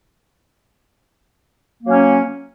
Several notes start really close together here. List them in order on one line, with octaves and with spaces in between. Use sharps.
A#3 F#3 C#4